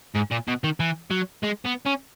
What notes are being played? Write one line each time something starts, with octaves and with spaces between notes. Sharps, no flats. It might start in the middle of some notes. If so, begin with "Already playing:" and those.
G#2
A#2
B2
D#3
E3
F#3
G#3
B3
C#4